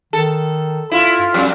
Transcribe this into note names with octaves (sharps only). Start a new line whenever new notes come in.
D#3 A4
E4 F4
G2
F2 G3 C#4